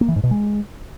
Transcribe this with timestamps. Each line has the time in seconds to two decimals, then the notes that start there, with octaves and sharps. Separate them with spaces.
0.01 A#3
0.08 E3
0.16 G#2
0.23 B2
0.31 G#3